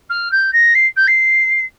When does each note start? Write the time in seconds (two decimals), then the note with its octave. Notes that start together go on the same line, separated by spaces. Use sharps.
0.10 F6
0.31 G6
0.53 A#6
0.74 C7
0.96 G6
1.07 C7